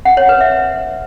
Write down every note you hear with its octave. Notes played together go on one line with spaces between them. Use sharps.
F#5
C#5
B4
E5